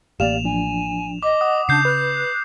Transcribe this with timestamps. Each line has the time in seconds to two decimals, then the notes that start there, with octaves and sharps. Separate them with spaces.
0.20 A1 A#3 G4 D5 F5 E7 F7
0.44 F3 D4 G#5
1.23 D#5 D6
1.41 F#5 D#6
1.69 C#3 D4 G6 C7
1.85 B4 F#6